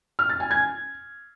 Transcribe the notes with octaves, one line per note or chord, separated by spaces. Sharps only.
F6
A6
G#5
G#6